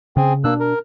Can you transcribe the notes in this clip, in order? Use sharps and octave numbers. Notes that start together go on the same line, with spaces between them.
C#3 C4 G#4
B2 A#3 D4 E6 F#6
A#4